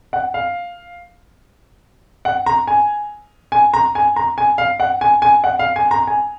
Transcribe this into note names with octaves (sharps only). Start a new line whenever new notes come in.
F#5
F5
F#5
A#5
G#5
G#5
A#5
G#5
A#5
G#5
F5
F#5
G#5
G#5
F#5
F5
G#5
A#5
G#5